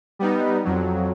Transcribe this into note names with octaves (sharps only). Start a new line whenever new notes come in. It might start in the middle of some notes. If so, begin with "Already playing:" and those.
G3 B3 D#4
F2 F#3